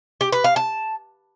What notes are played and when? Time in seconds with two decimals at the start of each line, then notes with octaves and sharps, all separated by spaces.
0.21 G4
0.32 B4
0.44 F5
0.56 A5